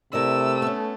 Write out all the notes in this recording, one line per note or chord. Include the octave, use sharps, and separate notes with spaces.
C3 A3 E4 A#4 D5 E6
B3 C#4